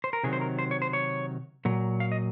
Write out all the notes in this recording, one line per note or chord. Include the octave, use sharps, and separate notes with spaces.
C5
A#4
C3 D#3 F#3 G#4
C5
A#4
C5
C#5
C5
C#5
A#2 F#3
F5
D#5